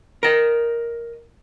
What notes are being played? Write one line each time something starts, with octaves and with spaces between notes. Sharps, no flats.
A#4 D#5